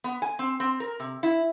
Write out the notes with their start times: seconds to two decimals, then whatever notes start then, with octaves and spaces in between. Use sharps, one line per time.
0.04 B3
0.22 G#5
0.39 C4
0.60 C4
0.80 A#4
1.00 C3
1.23 E4